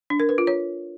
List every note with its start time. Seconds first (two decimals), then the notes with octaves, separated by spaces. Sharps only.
0.10 D4
0.20 A#4
0.29 B4
0.38 F4
0.47 C#5